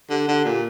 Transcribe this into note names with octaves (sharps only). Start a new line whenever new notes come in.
D3 G4
D3
A#2